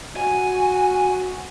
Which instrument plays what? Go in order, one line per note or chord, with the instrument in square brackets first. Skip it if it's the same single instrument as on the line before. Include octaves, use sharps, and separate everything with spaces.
[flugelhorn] F#4 [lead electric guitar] G#5